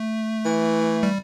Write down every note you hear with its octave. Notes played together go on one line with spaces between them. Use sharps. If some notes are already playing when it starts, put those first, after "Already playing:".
Already playing: A3
E3
G3